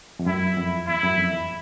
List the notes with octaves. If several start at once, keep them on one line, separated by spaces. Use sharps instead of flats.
F2
F#2 E4
F2
E2 E4
F#2
F2
E2